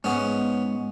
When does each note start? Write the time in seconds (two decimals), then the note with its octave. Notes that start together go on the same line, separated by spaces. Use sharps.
0.04 G#2 B3 C#4